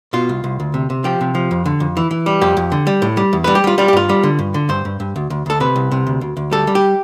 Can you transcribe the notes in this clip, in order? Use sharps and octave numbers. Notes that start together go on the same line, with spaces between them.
B2 F4
C2
C2
D2
C3
C3
F3 G4
C3
F3
F2
D3
F2
E3
E3
G3
F2 G4
F2
D3
G3
A2
G3
E2
G3 B4
G4
G3 F4
G3 F4
G4
G2 F4
G3
D3
G2
D3
G2 C5
G2
G2
D2
D2
D2 A4
C3 B4
C2
C3
D2
D2
D2
G3 A4
G3
G4